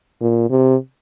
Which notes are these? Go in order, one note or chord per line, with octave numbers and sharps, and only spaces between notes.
A#2
C3